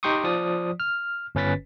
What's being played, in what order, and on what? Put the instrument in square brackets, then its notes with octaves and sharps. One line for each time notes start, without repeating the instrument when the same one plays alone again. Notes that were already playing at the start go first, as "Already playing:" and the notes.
[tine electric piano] D#4 G4 G5 C6 C#6 D#6
F3 D5 D#6
F6
G1 C#4 B4 A6 B6